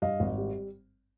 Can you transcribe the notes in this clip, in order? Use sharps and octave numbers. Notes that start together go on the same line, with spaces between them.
G2 D#5 F5
G#1
G3